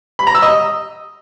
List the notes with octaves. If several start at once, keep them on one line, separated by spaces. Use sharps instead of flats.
B5
A#5
E6
D#5